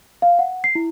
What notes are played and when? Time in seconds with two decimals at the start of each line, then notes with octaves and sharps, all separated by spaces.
0.22 F5
0.39 F#5
0.64 C7
0.75 E4